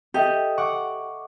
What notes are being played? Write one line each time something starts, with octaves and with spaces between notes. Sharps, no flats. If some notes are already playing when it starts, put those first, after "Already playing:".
G4 A4 D#5 E5
F#5 C#6 D6